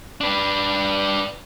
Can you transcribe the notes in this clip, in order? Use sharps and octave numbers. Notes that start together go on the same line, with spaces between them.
D4 B4